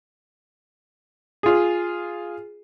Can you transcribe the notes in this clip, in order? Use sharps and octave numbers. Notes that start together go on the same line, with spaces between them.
F4 G#4